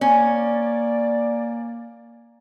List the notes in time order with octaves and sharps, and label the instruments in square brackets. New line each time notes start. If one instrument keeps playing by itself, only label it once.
[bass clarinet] A#3 [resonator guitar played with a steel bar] C#4 [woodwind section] D5